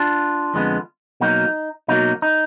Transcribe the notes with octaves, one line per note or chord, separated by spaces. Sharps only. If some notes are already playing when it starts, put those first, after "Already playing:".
Already playing: D4 F4
F2 D3 G#3 B3
B2 F#3 A#3 D#4
B2 F#3 A#3 D#4
D#4